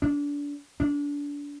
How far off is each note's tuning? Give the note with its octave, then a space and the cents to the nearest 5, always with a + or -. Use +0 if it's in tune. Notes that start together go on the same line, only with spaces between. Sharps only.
D4 -30
D4 -30